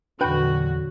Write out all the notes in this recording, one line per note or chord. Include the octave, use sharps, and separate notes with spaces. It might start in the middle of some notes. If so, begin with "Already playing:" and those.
A#1 E2 D3 F#3 D4 F#4 B4 G5